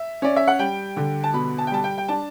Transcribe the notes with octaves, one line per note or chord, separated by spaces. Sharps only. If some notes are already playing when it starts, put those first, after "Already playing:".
Already playing: E5
C#4 D5
E5
F#5
G3 G5
D3
A5
B2 B5
A5
G5
G3 A5
G5
G5
D4 A5